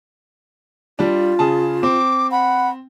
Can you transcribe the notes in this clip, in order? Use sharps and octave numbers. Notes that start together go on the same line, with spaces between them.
G3 D4 F4
C#3 G#4 A5
C4 D6
F#5 B5